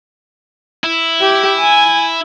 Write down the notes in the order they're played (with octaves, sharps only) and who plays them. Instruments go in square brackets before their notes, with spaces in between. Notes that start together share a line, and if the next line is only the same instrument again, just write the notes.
[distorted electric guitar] E4
[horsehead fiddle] G4
G#5